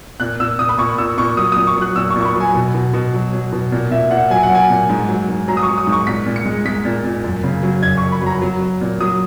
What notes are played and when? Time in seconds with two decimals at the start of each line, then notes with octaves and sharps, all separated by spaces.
0.20 A#2 F#6
0.40 A#2 E6
0.59 A#2 D#6
0.69 B5
0.78 A#2 C#6
0.98 A#2 E6
1.18 A#2 C#6
1.37 F#3 D#6
1.52 A#2 D#6
1.67 C#6
1.76 F#3
1.82 F#6
1.96 A#2 E6
2.10 C#6
2.16 A#2
2.21 C#6
2.25 B5
2.35 F#3
2.40 G#5
2.54 B2
2.75 B2
2.93 B2
3.14 F#3
3.33 F#3
3.52 B2
3.72 A#2
3.91 A#2 E5
4.10 A#2 F#5
4.30 F#3 G#5
4.43 F#5
4.50 F#3 G#5
4.70 A#2
4.89 G#2
5.09 F#3
5.29 G#2
5.48 F#3 A#5
5.57 D#6
5.63 C#6
5.68 F#3
5.78 D#6
5.87 G#2
5.93 C#6
6.07 A#2 B6
6.26 A#2
6.36 C#7
6.46 G#3
6.65 G#3 B6
6.85 A#2
7.04 A#2
7.24 F#2
7.43 C#3
7.63 F#3
7.82 F#2 G#6
7.97 F#2 C#6
8.12 B5
8.22 F#3 A#5
8.42 F#3
8.61 F#3
8.81 A#2
9.00 F#3 D#6